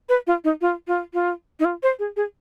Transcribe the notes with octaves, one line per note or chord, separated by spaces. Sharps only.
B4
F4
D#4
F4
F4
F4
D#4
F4
C5
G#4
G#4